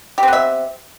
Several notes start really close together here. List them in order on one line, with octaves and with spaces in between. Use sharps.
G4 C4 B3 E5